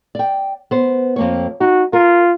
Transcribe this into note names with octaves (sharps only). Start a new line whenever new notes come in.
D5 G5
B3 C5
F2 A#3 C#5
D#4 F#4
F4 A#4